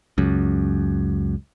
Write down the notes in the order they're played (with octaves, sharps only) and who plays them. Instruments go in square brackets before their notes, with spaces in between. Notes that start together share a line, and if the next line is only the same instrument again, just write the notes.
[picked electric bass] C#2 F#2